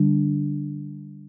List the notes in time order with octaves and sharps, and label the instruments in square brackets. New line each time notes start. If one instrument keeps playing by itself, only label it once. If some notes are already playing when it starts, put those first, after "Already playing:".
Already playing: [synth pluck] D3 G3 D4